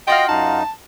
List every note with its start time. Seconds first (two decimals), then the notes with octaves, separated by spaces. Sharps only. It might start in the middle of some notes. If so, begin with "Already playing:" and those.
0.08 F4 F#4 D#5 F5 G5
0.29 F#2 D#4 A5